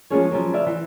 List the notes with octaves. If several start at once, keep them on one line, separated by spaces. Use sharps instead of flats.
F3 G#3 A#3 C#4 G#4 C#5
C#3 F3 F#3
B4 D5 E5 F5
E3